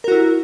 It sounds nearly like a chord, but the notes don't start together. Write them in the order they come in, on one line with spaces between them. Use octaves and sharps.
A#4 F#4 E4